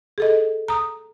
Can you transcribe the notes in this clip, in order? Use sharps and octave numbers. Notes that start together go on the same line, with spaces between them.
G#4 A4 D#5
A#5 D#6